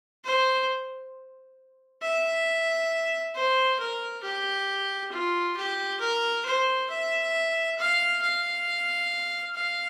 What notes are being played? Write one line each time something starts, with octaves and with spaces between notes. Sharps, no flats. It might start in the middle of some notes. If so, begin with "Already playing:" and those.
C5
E5
C5
A#4
G4
F4
G4
A#4
C5
E5
F5
F5
F5